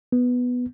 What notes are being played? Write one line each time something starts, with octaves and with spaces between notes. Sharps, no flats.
B3